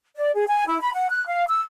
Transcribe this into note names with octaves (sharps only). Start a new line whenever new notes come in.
D5
G#4
G#5
E4
B5
F#5
F#6
F5
E6